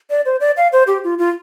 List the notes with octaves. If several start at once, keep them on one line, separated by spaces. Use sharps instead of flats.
D5
C5
D5
F5
C5
G4
F4
F4